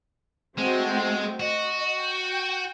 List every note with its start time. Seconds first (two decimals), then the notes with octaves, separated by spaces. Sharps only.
0.58 G#3 A3 C4 F#4
1.40 F#4 D#5
1.99 G5